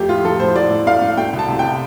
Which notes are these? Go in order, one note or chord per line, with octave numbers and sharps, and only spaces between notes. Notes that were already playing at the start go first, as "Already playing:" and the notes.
Already playing: F2 A3 G4
A2 F4
F3 A4
A2 C5
A2 D5
A2
A3 F5
A3
A3 G5
C2
A5
C3
G5